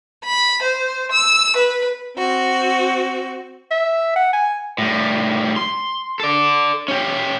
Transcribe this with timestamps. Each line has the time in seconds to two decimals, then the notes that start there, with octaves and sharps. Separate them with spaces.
0.24 B5
0.62 C5
1.11 E6
1.56 B4
2.17 C4 F#4
3.71 E5
4.16 F#5
4.33 G#5
4.78 A2 G3
5.56 C6
6.20 A4 D5
6.88 C#4 G4